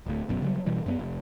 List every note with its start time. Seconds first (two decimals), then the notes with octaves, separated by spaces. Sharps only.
0.06 D1 D2
0.29 G1 F#2 B2
0.42 C#3 F#3 G3
0.66 B2 E3 G3
0.86 F#2 A#3 B3
0.99 F1